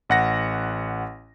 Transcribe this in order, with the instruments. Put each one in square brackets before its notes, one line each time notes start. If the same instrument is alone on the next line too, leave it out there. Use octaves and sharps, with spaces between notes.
[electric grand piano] A1 F#5 A#6